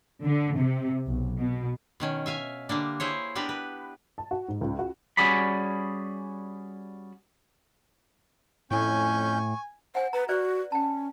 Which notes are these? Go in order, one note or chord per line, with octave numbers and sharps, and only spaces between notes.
D3
C3
B1
B2
B2 D#3 C#4
E5 F5 G#5
D3 G3 A#3 D4
E4 G#4 C5 C#5
B3 D4 G4 A#4 B4
B4
A5
F#4
G#2
C#2
F#4
G3 C#4 F#4 G#4 D5 B5
F2 A2 C#4 G#5 C#6 G6
C5 F#5 G#5
B4 A#5
F#4 B4 C5 D5
C#4 G5 A5